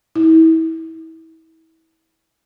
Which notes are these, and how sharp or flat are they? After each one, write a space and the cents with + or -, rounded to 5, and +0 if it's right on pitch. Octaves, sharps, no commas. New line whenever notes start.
E4 -30